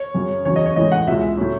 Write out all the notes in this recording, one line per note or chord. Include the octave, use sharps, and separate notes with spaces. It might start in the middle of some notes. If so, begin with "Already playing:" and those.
Already playing: C#5
F#2 C#3 F#3
E2 C#3 F#3 C#5
D#5
C#5
A2 E3 G#3 D#5
F#5
C#2 B2 G#3 E5
A2 F#3